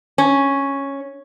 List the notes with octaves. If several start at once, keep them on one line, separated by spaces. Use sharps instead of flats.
C#4